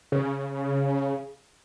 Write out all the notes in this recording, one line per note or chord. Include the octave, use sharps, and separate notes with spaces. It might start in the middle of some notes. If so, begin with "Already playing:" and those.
C#3